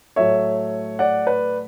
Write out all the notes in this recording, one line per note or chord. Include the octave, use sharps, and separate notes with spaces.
A2 F#3 A3 C#5 E5
D5 F#5
B4 D5